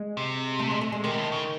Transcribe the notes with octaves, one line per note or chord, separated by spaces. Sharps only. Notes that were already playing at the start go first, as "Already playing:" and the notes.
Already playing: G#3
C3
A3
G#3
A3
G#3
C3 D#3
G#2
A2
C#3